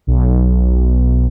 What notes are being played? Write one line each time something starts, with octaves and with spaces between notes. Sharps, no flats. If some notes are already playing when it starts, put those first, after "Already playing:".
B1